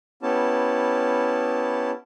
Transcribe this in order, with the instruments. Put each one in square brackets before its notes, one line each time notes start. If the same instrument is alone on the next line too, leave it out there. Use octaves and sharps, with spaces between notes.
[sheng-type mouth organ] B3 C#4 E4 G4 A5